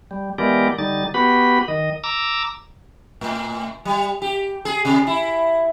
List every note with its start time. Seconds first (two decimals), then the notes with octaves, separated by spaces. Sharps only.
0.11 G3
0.38 E3 G#3 B3 G4 A#4 D5
0.78 D3 G3 D#4 A6
1.14 B3 F#4 G4 B4 B5
1.68 D#3 D#5
2.04 A#5 D6 E6
3.21 A2
3.85 G3
4.22 G4
4.65 G#4
4.85 C3
5.07 E4